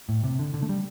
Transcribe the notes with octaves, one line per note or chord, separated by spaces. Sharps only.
A2
C3
D3
D3
A3
G3